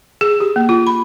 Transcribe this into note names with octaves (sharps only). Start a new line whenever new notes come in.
G#4
G4
A#3
F4
B5